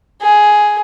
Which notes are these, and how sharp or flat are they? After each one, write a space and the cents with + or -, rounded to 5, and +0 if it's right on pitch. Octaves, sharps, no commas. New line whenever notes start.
G#4 +5